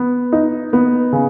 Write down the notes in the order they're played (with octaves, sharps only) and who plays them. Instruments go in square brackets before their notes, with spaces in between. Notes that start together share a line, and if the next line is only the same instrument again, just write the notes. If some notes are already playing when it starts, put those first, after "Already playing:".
Already playing: [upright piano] B3
D#4
B3
C#3